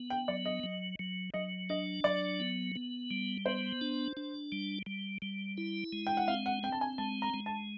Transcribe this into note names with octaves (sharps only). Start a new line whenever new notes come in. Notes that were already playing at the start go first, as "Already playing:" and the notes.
Already playing: B3
G5
F#3 D5
D#5
F#3
F#3
F#3 D#5
D4 D#5
F#3 D5
B3
B3
G3
B3 C5
D4
D4
G3
G3
G3
E4
G#3
G5
F#5
C4 F5
F#5
C4 G5
A5
G#5
G#3 A5
A#5
G#3
A5